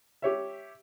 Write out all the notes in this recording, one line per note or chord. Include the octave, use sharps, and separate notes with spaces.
G4 C#5 E5